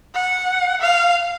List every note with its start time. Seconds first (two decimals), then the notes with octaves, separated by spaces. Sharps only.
0.14 F#5
0.81 F5